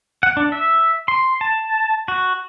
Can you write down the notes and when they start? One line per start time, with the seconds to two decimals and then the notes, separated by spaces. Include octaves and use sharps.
0.23 F#5
0.37 D4
0.52 E5
1.08 C6
1.41 A5
2.08 F#4